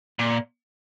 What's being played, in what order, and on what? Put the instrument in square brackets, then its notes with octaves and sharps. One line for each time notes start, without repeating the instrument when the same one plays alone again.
[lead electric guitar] A#2